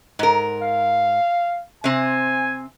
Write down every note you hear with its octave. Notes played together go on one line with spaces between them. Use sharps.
G#2 A#4
F5
C3 C4 G#5